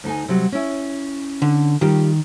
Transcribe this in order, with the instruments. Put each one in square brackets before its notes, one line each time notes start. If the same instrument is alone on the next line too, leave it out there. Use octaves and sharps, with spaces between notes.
[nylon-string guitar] D2 D#4 G#5
C3 F#3 G3
C#4 E4
[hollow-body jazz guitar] D3
[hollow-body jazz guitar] D#3 [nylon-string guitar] G3 F4 G4